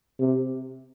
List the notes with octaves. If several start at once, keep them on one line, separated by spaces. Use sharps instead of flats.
C3